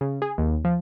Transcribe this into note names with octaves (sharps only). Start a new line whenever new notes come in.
C#3
G#4
D#2
F3